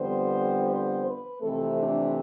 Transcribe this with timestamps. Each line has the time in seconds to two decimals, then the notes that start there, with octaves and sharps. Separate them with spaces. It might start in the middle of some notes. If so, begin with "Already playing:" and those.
Already playing: F2 D3 G3 B3 C5
0.67 C5
1.03 B4
1.41 F2 C3 E3 A3 C4 A4
1.78 D4